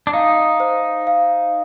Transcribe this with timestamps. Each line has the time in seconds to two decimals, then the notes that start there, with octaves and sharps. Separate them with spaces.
0.07 D4
0.13 D#4 F5
0.60 C5
1.07 F5